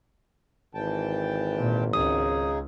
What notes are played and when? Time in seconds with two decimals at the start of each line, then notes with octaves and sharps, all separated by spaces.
0.75 G#1 E3 G5 A5
1.58 A#2
1.93 C#2 C#3 D#4 G#4 D#6